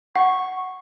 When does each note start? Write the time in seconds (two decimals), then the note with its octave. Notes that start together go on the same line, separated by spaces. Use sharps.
0.16 F#5 C#6